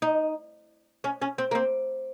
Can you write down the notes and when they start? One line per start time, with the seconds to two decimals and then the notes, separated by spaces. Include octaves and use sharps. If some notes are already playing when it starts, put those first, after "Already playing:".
0.02 D#4
1.04 C#4
1.22 C#4
1.38 C4
1.51 A#3
1.55 C4